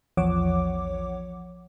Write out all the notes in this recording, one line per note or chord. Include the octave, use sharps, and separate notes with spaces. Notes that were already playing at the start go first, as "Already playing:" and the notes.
A#1 E2 F3 C#5 F#5 D6